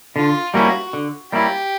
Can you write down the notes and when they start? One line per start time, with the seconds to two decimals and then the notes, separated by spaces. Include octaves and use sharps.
0.15 D3 F4
0.54 G3 A#3 C#4 E4 F#4
0.93 D3
1.32 G3 A#3 C#4 E4 G4